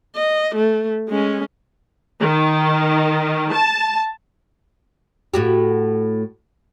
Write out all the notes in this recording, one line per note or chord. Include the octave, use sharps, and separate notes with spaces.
D#5
A3
G#3 C#4
D#3
A5
A2 F#4 G4